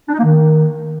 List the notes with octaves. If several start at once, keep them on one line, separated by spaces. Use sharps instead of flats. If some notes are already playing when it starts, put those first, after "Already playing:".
D4
D#4
A#3
D#3